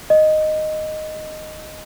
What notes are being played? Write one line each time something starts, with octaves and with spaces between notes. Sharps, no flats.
D#5